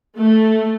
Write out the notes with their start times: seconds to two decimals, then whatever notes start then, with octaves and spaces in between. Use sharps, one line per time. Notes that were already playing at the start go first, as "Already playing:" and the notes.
0.18 A3